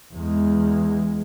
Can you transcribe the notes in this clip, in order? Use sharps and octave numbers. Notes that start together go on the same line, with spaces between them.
E2 G#3